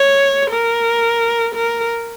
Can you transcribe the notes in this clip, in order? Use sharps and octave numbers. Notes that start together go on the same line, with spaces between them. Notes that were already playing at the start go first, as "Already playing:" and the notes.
Already playing: C#5
A#4
A#4